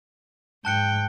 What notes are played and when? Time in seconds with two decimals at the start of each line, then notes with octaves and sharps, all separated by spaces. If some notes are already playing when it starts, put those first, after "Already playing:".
0.65 G#2 G5 A5 F#6 C#7